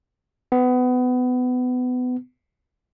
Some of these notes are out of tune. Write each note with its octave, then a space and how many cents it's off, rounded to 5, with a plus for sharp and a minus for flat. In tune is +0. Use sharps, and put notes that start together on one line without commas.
B3 +25